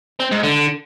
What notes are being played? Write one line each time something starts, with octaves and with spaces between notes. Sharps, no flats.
C4
G#2
D3